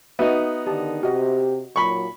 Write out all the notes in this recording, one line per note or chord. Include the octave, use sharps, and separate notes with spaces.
B3 D#4 F#4 E5
D3 D#3 G4 D#5 A5
C3 F#4 G4 D#5
A#2 F#3 B5 C#6